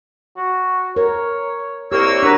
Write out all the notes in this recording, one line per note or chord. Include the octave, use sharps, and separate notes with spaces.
F#4
A#4 C#5
C2 A#3 G4 C#5 E6
D4 F#4 A#4 B4